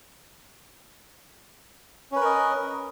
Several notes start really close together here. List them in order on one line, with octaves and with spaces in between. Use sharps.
C#4 B4 A#4 D#5